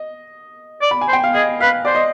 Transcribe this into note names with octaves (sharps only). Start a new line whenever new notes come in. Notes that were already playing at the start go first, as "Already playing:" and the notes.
Already playing: D#5
D5
B5
G#5
C5
G5
F5
G#4 D#5
B4 F5
C5 D5
D#5